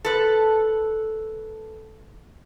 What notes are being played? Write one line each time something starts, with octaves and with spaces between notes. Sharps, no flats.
A4 B4